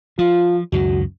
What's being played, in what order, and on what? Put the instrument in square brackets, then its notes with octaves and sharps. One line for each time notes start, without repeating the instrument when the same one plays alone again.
[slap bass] F3 [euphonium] F4
[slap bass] C#2 F#2 D#3 [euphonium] F#4